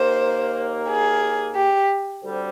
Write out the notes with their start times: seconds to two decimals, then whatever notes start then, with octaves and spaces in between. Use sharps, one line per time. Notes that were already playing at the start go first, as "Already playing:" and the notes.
Already playing: D#2 D#3 A#3 C5
0.88 G#4
1.56 G4
2.23 D2 D3 G3 C4